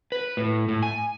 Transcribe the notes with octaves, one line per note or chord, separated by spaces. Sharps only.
B4
A2
A2
G#5